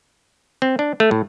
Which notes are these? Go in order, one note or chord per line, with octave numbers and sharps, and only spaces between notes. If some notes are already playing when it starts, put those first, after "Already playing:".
C4
D4
A3
A2